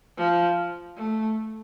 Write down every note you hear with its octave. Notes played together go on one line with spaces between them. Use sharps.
F3
A3